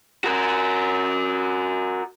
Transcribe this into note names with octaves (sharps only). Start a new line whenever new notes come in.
F#4 A#4